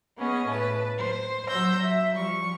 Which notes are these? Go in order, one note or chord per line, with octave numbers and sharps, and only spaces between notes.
B3 C#4 G#4 D#5
A2 B4 A5
C5
F#3 C5 E6 G6 A#6
E5
F3 G3 C#6